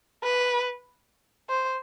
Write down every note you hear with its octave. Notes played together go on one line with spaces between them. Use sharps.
B4
C5